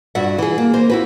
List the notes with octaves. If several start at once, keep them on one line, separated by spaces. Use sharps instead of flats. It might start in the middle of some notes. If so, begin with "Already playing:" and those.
G2 F#4 E5 F#5
E3 G#4
A#3
A#3 C5
E4 F#4 B4